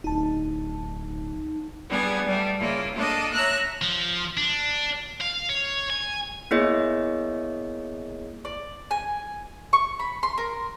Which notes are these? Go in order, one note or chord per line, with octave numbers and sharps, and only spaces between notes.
D1 D#4 A5
G3 B3 D4 G#4
G3 A3
C#3 A#3 E4 F4
A#3 D4 A4 D#5
C#5 E5 A#5 E6 F#6
F3
D4
F5
C#5
G#5
A#3 B3 E4 G#4 C#5 D#5
D5
G#5
C#6
B5
C6
A#4